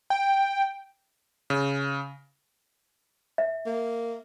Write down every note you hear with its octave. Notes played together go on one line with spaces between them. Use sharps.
G5
C#3
E5
A#3